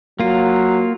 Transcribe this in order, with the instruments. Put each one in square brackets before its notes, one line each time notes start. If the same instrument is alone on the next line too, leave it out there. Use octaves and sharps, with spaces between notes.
[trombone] F#3 [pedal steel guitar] A#3 F4